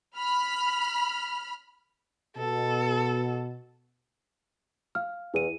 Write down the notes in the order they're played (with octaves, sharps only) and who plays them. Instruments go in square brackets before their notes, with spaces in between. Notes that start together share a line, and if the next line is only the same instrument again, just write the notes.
[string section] B5 F6
[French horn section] B2 [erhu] A4
[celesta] F5 F6
[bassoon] E2 [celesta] E4 D#7